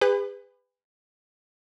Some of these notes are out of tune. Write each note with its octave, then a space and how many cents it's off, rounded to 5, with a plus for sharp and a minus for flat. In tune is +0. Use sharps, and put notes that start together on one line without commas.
G#4 -40 B4 +20